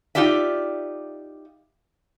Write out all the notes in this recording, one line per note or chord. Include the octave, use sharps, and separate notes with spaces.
D#4 F4 G4 D5 E5